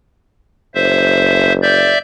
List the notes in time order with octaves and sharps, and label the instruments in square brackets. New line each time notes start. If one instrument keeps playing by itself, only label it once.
[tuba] F#1 [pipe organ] C5 E5
[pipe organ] D5 E5 G6